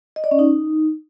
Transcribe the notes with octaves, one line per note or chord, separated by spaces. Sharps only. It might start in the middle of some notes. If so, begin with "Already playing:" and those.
D#5
D5
C#4
D#4